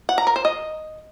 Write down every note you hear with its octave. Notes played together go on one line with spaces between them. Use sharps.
F#5
A#5
A#4
C5
D#5